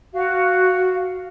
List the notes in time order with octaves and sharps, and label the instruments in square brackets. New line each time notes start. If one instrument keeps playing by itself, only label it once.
[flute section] F#4 F5